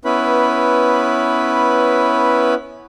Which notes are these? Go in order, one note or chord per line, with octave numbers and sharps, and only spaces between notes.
B3 C#4 E4 B4 B5